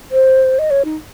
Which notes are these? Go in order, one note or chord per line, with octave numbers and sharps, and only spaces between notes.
C5
D#5
C#5
D#4